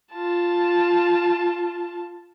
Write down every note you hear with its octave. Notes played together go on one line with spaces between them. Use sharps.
F4 A5